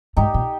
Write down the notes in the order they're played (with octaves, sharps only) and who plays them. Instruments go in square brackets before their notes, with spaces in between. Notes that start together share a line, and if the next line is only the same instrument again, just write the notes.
[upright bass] G#2 [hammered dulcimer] D#4 G4
[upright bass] A#2